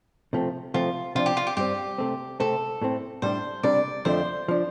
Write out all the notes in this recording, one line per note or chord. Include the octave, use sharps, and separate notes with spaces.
C3 F3 A3 C4
C3 F3 A3 C4 F4
C3 F3 D4 F4
G4
F4
G4
G2 G3 C4 G4
C3 A3 C4
C3 A3 C4 A4
A2 A3 C4
A2 G3 D4 C5
C3 G3 D4 D5
F2 D3 F3 A3 D4 C5
F3 D4